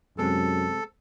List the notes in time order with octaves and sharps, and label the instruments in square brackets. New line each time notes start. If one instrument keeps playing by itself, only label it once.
[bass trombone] F#2 [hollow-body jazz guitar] C3 G#3 C4 [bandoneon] A4